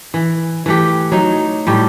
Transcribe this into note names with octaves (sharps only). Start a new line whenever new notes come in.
E3
E3 A3 G4
F#3 D#4
A2 G3 G4